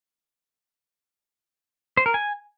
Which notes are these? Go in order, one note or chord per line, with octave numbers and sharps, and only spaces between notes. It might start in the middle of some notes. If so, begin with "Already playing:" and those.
C5
A#4
G#5